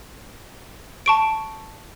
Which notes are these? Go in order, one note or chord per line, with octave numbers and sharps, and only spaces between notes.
A5 C#6 D7